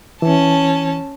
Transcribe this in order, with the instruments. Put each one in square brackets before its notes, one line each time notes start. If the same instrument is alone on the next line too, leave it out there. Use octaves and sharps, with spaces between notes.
[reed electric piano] E3 [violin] C#4 A5